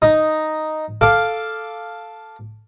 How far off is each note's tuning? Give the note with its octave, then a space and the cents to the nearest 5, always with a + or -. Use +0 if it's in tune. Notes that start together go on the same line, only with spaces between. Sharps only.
D#4 +0 D#6 +0
A4 +0 F5 +0 D6 +0